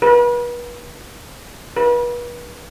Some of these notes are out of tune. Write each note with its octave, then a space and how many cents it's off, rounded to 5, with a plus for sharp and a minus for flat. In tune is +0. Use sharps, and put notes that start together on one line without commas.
B4 -40
B4 -40